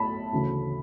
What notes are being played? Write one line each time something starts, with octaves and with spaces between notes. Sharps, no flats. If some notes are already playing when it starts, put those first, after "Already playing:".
Already playing: B1 A2 A5 B5
D2 C#3 E3